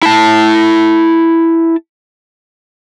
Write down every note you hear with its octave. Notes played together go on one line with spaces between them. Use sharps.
E4 A5